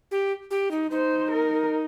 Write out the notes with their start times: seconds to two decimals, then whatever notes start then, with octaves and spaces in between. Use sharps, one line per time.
0.11 G4
0.51 G4
0.71 D#4
0.91 D#4 C5
1.31 A#4